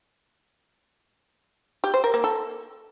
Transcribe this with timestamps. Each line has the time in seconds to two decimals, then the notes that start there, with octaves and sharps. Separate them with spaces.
1.84 G4
1.94 C5
2.04 A#4
2.14 A#3
2.24 A4